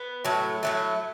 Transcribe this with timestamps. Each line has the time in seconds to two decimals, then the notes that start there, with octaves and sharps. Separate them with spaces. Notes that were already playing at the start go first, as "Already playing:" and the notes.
Already playing: B3
0.25 A2 F#3 A3
0.63 A2 F#3 A3